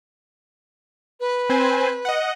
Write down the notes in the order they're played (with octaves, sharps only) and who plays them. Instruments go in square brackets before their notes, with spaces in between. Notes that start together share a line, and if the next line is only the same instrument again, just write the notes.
[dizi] B4
[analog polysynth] C4 C5 G#5
D#5 F#5